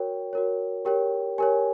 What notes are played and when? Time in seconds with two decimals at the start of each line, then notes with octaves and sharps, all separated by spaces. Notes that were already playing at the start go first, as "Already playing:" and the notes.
Already playing: F#4 A#4 C#5 G5
0.33 F#4 A#4 C#5
0.85 G4 A#4 C#5 G5
1.38 G4 A#4 C#5 G#5